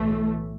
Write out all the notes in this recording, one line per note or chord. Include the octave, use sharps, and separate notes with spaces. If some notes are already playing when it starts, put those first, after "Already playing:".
Already playing: B1 A2 E3 A3